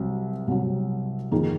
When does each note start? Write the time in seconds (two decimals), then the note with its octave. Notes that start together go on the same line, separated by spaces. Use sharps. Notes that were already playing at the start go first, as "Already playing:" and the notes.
Already playing: C2 C3 F#3
0.47 C2 C3 F#3
1.31 F2 D#3 A#3 D#4 G#4